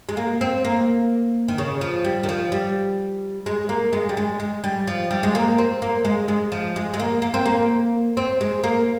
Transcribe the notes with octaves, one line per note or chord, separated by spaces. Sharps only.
G#3
A#3
C4
A#3
D#3
C#3
F3
G3
D#3
F3
G3
G#3
A#3
G#3
G3
G#3
G#3
G3
F3
G3
G#3
A#3
C4
A#3
G#3
G#3
F3
G#3
G#3
A#3
A#3
C4
A#3
C4
G#3
A#3